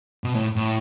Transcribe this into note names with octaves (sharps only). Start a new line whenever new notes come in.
B2
A2
A2